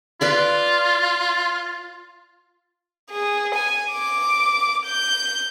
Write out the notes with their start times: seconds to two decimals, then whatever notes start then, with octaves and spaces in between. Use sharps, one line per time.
0.21 F4 B4 D5 B5
3.11 G#4
3.55 G#5
3.92 D6
4.86 G6